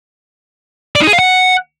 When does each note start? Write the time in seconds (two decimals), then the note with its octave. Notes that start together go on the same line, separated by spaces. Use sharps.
0.96 D5
1.01 D#4
1.07 G#4
1.13 F5
1.19 F#5